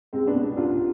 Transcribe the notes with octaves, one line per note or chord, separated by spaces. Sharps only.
C2 G#3 C4
B3 D4
B2
C2 D4 F4